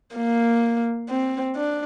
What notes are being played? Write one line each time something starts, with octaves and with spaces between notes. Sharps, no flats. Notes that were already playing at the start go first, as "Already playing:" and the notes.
A#3
C4
D4